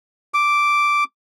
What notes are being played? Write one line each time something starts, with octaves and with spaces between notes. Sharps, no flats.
D6